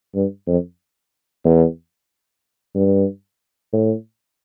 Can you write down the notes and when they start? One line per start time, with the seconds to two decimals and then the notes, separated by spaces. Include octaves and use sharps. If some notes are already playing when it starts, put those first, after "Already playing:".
0.15 G2
0.48 F2
1.45 E2
2.75 G2
3.73 A2